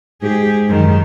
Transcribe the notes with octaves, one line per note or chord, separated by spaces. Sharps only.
G#2 G4 G#4
F#2 D#3